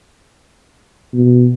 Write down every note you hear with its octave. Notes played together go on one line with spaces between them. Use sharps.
B2